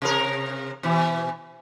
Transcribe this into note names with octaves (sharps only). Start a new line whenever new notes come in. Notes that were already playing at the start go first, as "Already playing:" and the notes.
C3 A#4
B2 E3